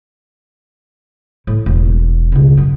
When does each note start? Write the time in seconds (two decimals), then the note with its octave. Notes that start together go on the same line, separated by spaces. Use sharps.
1.47 A2
1.66 E1
2.32 C#2 B2
2.57 F#2